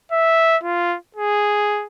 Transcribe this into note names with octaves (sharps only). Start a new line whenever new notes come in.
E5
F4
G#4